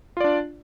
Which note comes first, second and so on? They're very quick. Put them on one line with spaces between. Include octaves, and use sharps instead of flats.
F4 D5 D4